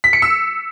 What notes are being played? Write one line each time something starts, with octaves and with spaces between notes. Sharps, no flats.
B6
C#7
E6